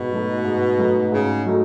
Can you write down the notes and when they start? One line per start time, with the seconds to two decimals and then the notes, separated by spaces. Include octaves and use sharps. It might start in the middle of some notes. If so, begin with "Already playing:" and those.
Already playing: G#2 B2
0.12 F#3 A3 D#4
0.44 G#2
0.78 F#3 A3 D#4
1.12 G#2 C#3
1.45 F#3 A3 D#4